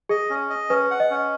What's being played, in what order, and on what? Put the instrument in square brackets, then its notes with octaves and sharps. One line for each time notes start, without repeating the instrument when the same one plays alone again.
[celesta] G#4 [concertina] D#5
[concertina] C#4
D#5
[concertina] C#4 [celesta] B4
[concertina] F#5
[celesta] D#5
[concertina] C#4